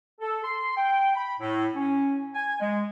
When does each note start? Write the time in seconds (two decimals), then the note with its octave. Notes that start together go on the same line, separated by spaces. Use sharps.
0.21 A4
0.44 C6
0.77 G5
1.15 B5
1.40 A2
1.75 C#4
2.34 G#5
2.60 G#3